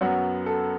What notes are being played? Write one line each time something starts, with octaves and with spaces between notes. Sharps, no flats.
F#2 F#3 B3 F#4
A4